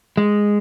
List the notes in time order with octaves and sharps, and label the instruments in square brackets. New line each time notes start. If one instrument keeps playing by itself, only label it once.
[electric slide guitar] G#3